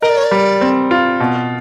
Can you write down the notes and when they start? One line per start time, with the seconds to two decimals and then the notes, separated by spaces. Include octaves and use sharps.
0.02 A#4 D#5
0.09 D5
0.17 C#5
0.24 D5
0.31 G3
0.61 C4
0.91 F4
1.20 B2